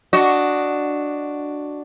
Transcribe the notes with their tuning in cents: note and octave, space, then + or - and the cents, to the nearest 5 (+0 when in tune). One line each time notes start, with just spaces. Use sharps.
D4 +0 F#4 +0 D#5 +0